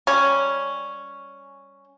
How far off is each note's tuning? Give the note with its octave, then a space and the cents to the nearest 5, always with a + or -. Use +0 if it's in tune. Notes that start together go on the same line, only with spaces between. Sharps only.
G3 +0 C#4 +0